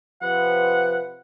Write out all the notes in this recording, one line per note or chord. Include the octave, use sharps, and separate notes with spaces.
C3 F3 B4 F#5